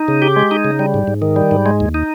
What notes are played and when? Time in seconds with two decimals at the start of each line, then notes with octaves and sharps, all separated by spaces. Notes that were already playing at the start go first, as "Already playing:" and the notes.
Already playing: D#4
0.08 C#3
0.22 G4
0.36 G#3
0.51 D#4
0.65 C#3
0.79 G3
0.94 G#2
1.07 G#2
1.22 D#3
1.36 G3
1.51 G#2
1.66 G#3
1.80 D#2
1.94 D#4